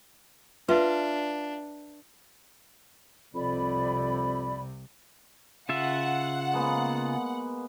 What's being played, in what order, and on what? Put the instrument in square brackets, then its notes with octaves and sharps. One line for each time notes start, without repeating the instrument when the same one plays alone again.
[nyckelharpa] D4 [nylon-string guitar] F4 [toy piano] B4 E5
[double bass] C2 C3 [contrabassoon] F2 [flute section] D5 B5
[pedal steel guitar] C#3 F4 E5 [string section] F#5
[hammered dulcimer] G#3 A#3 B3